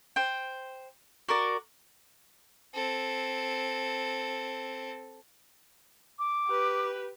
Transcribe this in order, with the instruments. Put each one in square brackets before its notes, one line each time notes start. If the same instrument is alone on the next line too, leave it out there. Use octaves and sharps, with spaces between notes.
[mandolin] C5 G5
F#4 A#4 D5
[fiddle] C4 A4
[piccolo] D6
[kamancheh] G4 B4